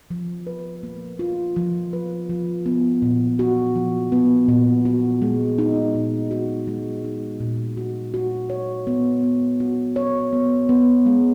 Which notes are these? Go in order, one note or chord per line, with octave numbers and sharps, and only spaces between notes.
F3
B4
A#3
F4
F3
B4
F3
B3
A#2
F#4
F3
B3
A#2
F#4
G#3
D#4
A#2
F#4
G#3
D#4
A#2
F#4
F#4
C#5
B3
B3
F#4
C#5
B3
B3
G#3